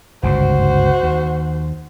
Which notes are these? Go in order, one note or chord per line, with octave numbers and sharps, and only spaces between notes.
G1 C#2 G#2 F#4 C5
D#2